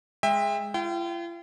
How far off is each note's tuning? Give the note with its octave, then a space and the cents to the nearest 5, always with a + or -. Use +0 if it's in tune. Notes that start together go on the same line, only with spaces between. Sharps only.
G#3 +0 E5 +0 G5 +35
F4 -45 G5 -25